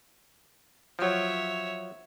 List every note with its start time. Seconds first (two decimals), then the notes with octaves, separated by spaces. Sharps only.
0.99 F3 F#3 C#5 E5